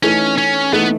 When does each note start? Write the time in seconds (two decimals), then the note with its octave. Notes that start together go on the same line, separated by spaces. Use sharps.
0.03 E3 A3 C#4 D#4
0.38 C#4
0.73 E3 A3 B3 D#4